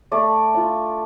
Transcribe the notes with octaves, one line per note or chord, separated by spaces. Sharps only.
A3 D5
D4 F4